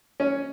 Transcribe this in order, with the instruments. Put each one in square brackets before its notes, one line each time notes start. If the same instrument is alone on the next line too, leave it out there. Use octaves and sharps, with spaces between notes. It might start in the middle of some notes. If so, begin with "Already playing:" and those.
[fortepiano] C#4